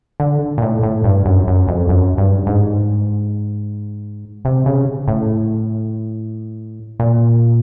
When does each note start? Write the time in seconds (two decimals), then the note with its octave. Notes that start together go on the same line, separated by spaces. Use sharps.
0.20 D3
0.58 A#2
0.62 A2
0.83 A2
1.04 G2
1.25 F#2
1.48 F#2
1.68 F2
1.89 F#2
2.18 G2
2.47 G#2
4.45 C3
4.66 C#3
5.08 A2
7.00 A#2